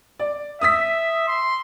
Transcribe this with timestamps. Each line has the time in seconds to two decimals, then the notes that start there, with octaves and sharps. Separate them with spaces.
0.19 D5
0.61 E5 D#6 E6 B6
1.27 C6